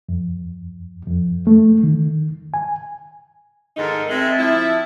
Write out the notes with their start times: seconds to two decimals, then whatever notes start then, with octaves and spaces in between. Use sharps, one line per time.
0.09 F2
1.07 F2
1.47 A3
1.83 D#3
2.54 G#5
3.77 G#2 D#3 D#4 A4 A#4
4.09 G#3 C4 E5 A5
4.39 F3 E4